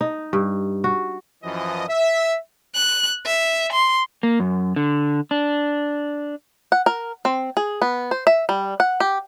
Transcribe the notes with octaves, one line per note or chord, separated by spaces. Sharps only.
D#4
G2
F#4
F#2 E3 F3 D#5
E5
F#6
E5
C6
A#3
F#2
D3
D4
F#5
A#4
C4
G#4
B3
C5
E5
G3
F#5
G4